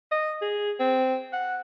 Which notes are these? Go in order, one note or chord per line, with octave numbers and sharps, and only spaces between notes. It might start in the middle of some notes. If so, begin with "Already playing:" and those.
D#5
G#4
C4
F#5